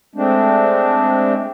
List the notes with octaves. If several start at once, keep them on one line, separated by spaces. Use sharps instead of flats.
G#3 A3 C4 D4